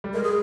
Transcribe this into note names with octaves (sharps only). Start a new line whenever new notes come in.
G3
G#3 A#4
G#4